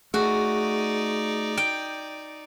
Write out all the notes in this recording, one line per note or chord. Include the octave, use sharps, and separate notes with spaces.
A3 D#4 F#4 G#4 D5
G5